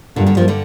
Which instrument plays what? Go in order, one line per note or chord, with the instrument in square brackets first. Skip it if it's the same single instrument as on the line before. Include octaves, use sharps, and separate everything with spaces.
[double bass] G2 [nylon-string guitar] A#2 D3
[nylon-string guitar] D3 G3
F3 A#3
D3 G3